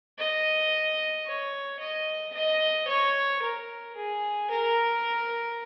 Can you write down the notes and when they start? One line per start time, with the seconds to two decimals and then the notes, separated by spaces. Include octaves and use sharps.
0.18 D#5
1.26 C#5
1.80 D#5
2.34 D#5
2.88 C#5
3.42 A#4
3.96 G#4
4.51 A#4